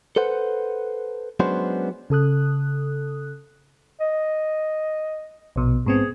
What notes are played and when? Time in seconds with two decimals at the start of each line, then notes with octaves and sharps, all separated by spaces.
0.16 A4 B4 C5 F#5
1.40 F#3 G#3 B3 C#4 D4 C5
2.10 C#3 A4 D#6 F#6
4.00 D#5
5.56 A#1 B2
5.86 G#2 B3 C4 G#4